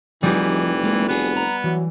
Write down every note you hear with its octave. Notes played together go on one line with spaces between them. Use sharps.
F1 E3 F3 G3 D#4 G4 G#4
G#3 A#3
F1 B3 F#4 G#4
A#5
E3 F#3